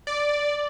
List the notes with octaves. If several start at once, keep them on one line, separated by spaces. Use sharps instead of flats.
D5